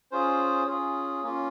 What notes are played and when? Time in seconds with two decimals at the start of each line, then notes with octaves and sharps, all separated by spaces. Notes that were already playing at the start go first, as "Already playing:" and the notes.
0.11 C#4 F4 G#4 C5
0.67 C#4 F4 G#4
1.23 A#3 C#4 F4